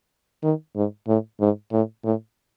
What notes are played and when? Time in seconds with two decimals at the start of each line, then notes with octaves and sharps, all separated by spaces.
0.43 D#3
0.76 G#2
1.07 A2
1.40 G#2
1.72 A2
2.04 A2